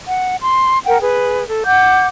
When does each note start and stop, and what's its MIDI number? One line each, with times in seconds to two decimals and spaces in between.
0.09 0.35 78
0.42 0.79 84
0.85 1.00 70
0.85 1.00 78
0.85 1.00 79
1.00 1.44 68
1.00 1.44 71
1.48 1.62 69
1.65 2.06 78
1.65 2.06 86
1.65 2.06 91